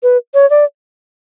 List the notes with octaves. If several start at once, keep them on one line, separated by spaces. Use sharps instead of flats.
B4
C#5
D5